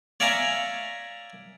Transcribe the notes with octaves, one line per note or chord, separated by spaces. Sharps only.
C#5 D5 E5 F5 G#5 A#5